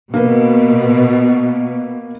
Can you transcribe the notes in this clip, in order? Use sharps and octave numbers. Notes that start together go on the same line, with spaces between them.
B2 A#3 B4